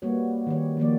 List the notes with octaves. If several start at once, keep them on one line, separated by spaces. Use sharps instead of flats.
G3 A#3 B3 F#4 C#5
D#3 G4 C#5
D#3 F3 A#3 D5